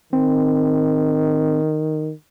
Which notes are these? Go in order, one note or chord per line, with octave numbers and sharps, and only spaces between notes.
D#3 C4